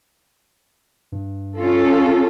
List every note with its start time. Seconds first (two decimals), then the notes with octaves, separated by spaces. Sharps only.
1.12 G2
1.57 C#4 F4 A4